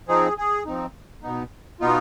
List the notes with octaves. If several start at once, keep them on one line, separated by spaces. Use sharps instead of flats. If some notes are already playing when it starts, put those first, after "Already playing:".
F3 C4 D#4 G#4
G#4
F3 C4 D#4
B2 B3 D#4
B2 B3 D#4 F4